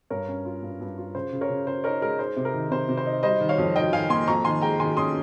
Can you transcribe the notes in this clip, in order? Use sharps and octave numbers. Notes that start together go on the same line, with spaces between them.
G2 A#4 C#5
C#4
F4
G2
G2
F4
C#3 C5
C#3
A#4 C#5
C#3
C#3 C5
D#4 A#4 C#5
G#3 A#4
D#4 C5
C3
A#4
D#3
C3 C5
C3
C5
D#4
G3 C5 D#5
D#3
C#5 F5
F2
D#3 D#5 G5
D#3 F5 G#5
A#3 G#5 C6
F2 A#5 C#6
D#3 G#5 C6
G#3 G5 A#5
D#3 G#5 C6
C#4 C6 D#6